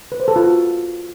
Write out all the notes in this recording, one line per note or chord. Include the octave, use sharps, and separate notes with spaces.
B4
C5
A4
F4
F#4